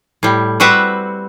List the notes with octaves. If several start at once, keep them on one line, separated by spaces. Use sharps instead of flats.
A2 G3
G3 C4 F#4 B4 E5 F#5